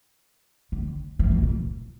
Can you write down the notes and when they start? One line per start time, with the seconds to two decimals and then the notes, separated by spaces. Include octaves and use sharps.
0.72 D3
1.19 E3
1.31 E3
1.43 A#2